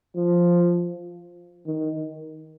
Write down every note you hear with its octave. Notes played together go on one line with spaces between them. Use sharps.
F3
D#3